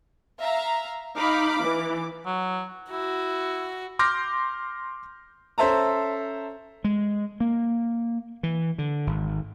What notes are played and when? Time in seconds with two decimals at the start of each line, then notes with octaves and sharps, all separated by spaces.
0.39 E5 F5 A#5
1.17 D#4 F5 B5 D6
1.63 E3
2.26 F#3
2.91 E4 F#4
3.99 C6 D6 F6 G6 A#6
5.58 C#4 A4 C5 E5 A5 A#5
6.84 G#3
7.40 A#3
8.43 E3
8.78 D3
9.07 G#1